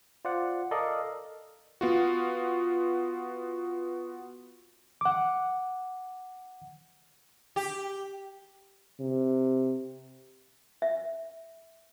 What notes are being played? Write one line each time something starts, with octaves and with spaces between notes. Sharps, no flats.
F4 C5 D5 F#5
A4 A#4 D5 D#5 F5
B3 F4 F#4
F#5 D6
G4
C3
E5